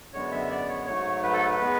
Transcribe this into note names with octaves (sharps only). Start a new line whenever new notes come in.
F#2 D3 G#3 B3 C#5
E5
D5
C#5
G#2 F#3 A3 C#5
B4
A4
B4
G#3 B3